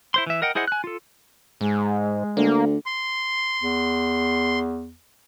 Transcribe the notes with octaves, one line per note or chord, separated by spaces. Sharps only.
E4 C5 C6
E3 E5
A#4 D#5 F#5 G5
E4 G#4 C5 D#5 F#5
G#5 F#6
F4 A4
G#2 G#3
D2 A#3
C6
E2